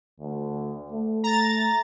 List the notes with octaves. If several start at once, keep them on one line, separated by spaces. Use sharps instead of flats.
D2
A3
A#5 A6